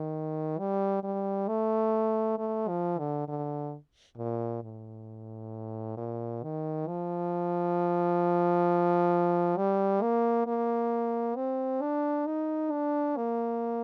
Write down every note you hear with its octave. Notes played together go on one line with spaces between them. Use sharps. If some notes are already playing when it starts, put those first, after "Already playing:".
Already playing: D#3
G3
G3
A3
A3
F3
D3
D3
A#2
A2
A#2
D#3
F3
G3
A#3
A#3
C4
D4
D#4
D4
A#3